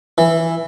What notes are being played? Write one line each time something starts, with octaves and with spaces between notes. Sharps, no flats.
E3